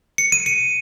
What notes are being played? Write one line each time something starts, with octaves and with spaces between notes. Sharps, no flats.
C#7
D#7
C#7